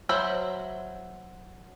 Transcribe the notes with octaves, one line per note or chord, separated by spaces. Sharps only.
F#3 C5 E5 B5